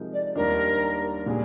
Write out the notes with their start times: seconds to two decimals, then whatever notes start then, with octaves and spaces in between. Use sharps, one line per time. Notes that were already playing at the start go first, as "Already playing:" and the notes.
Already playing: C3 F3 G#3 D#4 A#4
0.13 D5
0.36 D#2 D#3 G3 D4 A#4
1.26 A#2 G3 D4 G#4